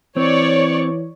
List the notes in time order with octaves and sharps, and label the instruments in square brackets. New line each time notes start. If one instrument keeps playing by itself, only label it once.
[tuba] E3 [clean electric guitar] C4 [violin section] C#5 D5 C#6